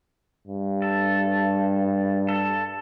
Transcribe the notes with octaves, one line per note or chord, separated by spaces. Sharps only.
G2
A4
A4